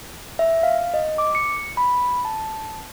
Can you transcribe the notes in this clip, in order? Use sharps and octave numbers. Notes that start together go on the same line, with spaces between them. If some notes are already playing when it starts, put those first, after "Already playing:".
E5
F5
D#5
D6
C#7
B5
A5